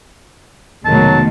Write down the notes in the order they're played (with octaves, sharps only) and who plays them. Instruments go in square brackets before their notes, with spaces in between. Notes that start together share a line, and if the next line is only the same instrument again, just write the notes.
[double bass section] F1 A3 [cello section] B2 D#3 G#3 [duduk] F#3 [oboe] A5